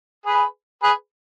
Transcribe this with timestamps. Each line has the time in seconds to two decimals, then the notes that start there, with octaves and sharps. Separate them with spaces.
0.26 G#4 B4
0.83 G#4 B4